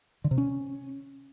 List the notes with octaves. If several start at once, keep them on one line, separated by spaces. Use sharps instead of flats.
D3
C3
C#4